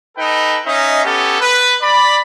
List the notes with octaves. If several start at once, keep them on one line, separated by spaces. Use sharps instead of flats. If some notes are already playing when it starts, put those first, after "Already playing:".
D#4 A4 B4 G5
C#4 D#4 D#5 E5
B3 C#4 G4 A4
B4
D5 B5